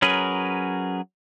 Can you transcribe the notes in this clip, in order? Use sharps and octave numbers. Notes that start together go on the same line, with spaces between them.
F#3 C#4 G#4 A#4 B4